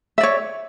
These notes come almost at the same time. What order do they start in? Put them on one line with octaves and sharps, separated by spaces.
E5 D5 C#5